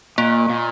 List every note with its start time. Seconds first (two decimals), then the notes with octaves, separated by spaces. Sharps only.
0.18 A#2 A#3
0.49 A#2